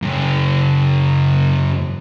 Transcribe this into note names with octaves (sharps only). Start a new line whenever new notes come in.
F#2 C#3